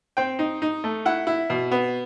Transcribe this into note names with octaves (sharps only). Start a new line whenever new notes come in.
C4 G5
D#4
D#4
A3
E4 F#5
E4
B2
B3